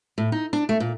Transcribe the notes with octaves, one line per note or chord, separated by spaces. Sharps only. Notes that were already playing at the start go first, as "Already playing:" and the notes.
A2
D#4
D4
A3
A#2